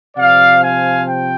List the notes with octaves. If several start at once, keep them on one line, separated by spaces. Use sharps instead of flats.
C3 F3 D5 F5
F5 G#5
G5